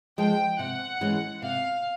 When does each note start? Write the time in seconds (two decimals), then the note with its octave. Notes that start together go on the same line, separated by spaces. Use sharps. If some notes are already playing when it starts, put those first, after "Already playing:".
0.17 F3 G#3 G5
0.59 C3 F#5
1.01 E3 G#3 C#4
1.42 C3 F5